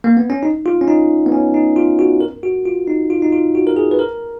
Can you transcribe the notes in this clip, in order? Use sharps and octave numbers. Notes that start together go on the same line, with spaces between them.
A#3
B3
C#4
D#4
F4
C#4
D#4
B3
C#4
D#4
F4
F#4
A#4
F#4
F4
D#4
F4
D#4
F4
F#4
A#4
G#4
B4
A#4